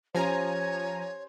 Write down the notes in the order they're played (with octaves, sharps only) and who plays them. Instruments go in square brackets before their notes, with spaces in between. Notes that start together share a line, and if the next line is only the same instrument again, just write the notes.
[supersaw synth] F3 G#5 A#5 [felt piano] C#4 G4 C5 [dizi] C#5